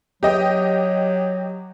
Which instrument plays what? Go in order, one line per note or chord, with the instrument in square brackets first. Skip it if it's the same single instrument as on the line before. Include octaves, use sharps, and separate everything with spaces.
[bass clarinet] F#3 [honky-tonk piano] G4 D#5 G5